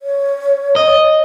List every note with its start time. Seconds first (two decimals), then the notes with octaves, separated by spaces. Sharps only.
0.02 C#5
0.76 D#5